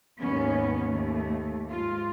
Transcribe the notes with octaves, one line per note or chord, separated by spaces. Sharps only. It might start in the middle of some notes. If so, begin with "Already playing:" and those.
D#2 G#2 D#3 B3 C#4
D#2 A3
G#2 F4